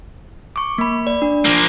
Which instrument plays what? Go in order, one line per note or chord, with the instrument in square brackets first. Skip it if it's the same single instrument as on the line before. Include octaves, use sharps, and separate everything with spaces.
[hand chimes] C#6 D6
A#3 B5
D5
D4
[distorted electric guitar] F3 A#3